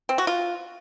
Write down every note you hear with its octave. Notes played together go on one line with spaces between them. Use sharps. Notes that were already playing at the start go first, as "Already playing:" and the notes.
C4
F#4
F4